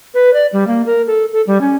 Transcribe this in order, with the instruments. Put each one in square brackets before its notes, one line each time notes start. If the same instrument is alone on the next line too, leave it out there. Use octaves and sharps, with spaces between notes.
[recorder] B4
D5
G3
A#3
A#4
A4
A4
G3
C#4